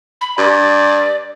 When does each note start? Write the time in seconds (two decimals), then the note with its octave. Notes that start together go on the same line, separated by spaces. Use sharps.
0.21 B5
0.38 G2 D5